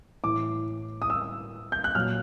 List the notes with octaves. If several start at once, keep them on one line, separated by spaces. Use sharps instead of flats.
A2 E3 D6
D#6
E6
G6
F#6
A#2 F#3 F6